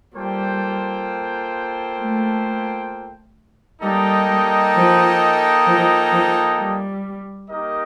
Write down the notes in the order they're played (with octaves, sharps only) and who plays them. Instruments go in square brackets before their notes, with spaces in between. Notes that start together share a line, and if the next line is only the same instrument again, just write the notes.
[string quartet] G3 [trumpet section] A#3 F4 A4 C5 G5
[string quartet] A3
[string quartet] G3 [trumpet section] A#3 D#4 A4 D#5 G5
[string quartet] G3
F3
F3
F3
G3
[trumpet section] A#3 D#4 G4 A#4 D#5